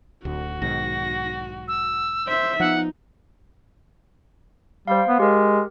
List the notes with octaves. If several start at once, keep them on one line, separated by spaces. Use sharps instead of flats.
D1 D2 F#4
B1 G#2 D#3 A#6
E6
C5 E5
F3 B3 D#4 F#5
G3 C5 F5
B3
G#3 G4 A#4